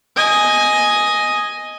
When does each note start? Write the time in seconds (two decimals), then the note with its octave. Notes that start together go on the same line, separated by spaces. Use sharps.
0.16 D#5 G#5